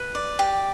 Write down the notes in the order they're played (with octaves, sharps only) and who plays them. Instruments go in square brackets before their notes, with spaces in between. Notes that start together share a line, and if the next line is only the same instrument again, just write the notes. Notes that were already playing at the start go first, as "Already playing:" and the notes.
Already playing: [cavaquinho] B4
D5
G4